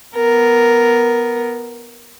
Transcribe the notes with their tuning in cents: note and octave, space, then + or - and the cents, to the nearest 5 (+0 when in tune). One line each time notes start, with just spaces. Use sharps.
B3 +0 A#4 +0